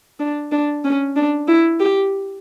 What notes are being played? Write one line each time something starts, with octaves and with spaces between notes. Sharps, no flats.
D4
D4
C#4
D4
E4
G4